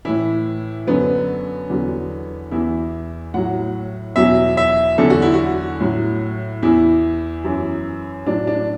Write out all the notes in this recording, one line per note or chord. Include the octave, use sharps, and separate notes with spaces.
A2 E3 E4
F#2 D3 F#3 B3
E2 D3 F#3
E2 E3 E4
A2 F#3 F#5
E2 B2 F#3 E5
E5
E2 D3 F#3 A4
F#4
E4
F#4
A2 F#3
E2 E3 E4
F#2 E3
A2 F#3 D4
D4